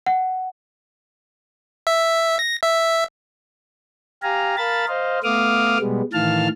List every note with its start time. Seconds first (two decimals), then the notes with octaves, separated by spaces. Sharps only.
0.06 F#5
1.87 E5
2.39 A#6
2.63 E5
4.23 G4 F5 G#5 A#5
4.57 A#4 F5 A5 B5 A6
4.88 C5 D#5 F5
5.24 A3 B3 F5 D6 D#6 F6
5.80 B2 G3 G#3 B3
6.13 A2 D#3 E3 F5 A5 F6